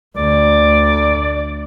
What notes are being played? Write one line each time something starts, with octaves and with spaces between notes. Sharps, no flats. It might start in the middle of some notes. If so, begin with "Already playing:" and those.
D2 D5